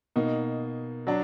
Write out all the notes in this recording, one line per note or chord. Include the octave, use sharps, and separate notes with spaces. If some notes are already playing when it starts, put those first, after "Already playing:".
B2 A#3 D#4
F#3 D4